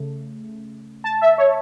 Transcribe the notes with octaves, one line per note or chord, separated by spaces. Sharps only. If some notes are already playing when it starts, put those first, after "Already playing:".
Already playing: C#3 A3
A5
E5
C#5